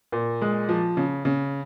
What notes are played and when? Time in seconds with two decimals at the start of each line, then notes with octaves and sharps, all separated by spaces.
0.12 A#2
0.42 G#3
0.69 F3
0.97 C#3
1.25 C#3